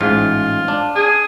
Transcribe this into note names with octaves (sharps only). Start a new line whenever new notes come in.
A1 G#2 F4
D4
G#4